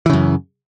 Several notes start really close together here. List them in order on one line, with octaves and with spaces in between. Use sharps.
E3 C#3 F#2